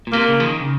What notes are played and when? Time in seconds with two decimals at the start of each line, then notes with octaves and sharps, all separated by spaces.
0.07 A#2
0.12 C3 A#3
0.29 C#3
0.40 F3
0.44 D#3
0.61 C#3